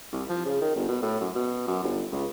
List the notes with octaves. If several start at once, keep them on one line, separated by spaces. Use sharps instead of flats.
C2
F3
C#3
D#3
G1
B2
A2
F#2
B2
F#2
G1
C#2